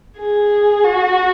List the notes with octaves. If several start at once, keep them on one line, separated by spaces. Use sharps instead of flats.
G#4
F#4